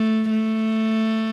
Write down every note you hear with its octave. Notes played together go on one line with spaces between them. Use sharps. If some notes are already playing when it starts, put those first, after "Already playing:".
Already playing: A3
A3